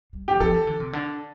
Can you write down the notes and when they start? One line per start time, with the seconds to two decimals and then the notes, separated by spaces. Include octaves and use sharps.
0.13 G3
0.28 E3 G4
0.40 F3 A4
0.54 E3
0.67 D3
0.80 C3
0.93 D3